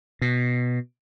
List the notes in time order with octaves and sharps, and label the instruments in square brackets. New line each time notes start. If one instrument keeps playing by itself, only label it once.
[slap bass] B2